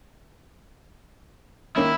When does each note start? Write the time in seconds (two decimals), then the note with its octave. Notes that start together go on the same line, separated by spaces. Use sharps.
1.77 D#3 A#3 C#4 E4